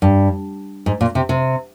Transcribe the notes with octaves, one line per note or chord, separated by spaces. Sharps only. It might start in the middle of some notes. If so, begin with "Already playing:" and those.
G2
G#2
A#2
C3
C3